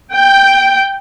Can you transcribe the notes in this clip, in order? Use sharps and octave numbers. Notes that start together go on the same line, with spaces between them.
G5